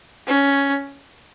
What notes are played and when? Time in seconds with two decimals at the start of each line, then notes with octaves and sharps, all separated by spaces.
0.27 C#4